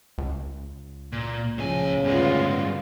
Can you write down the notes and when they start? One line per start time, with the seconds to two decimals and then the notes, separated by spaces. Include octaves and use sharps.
0.18 C#2
1.12 A#2
1.58 A2 C#3 F3 G#5
2.04 D2 G2 G#3 B3 F4